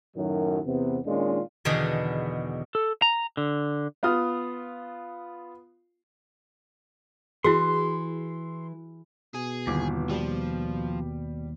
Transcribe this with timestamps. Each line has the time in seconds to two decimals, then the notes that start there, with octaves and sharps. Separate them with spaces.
0.16 F#2 A2 D#3 F#3
0.66 E2 C3 B3
1.06 A#2 D#3 G#3 C#4 D4 F4
1.65 E2 B2 D3 D#3 D4 G#4
2.75 A4
3.02 A#5
3.37 D3
4.03 B3 F4 D#6 F6
7.44 E3 E4 F#4 G#4 C6
9.34 B2 G#4
9.67 G1 D#2 E3 D6
10.10 F3 G3